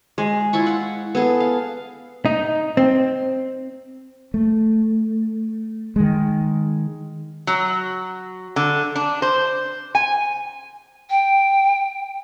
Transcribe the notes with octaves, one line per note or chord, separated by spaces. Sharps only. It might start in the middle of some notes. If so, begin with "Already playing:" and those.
G#3
E4 F4 B5 C#6
F#5
B3 G#4 A4
F5
D#4
C4
A3
D#3 G#3
F#3
D3
D4
C5
G#5
G5